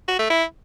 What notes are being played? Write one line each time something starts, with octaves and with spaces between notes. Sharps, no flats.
F#4
A3
E4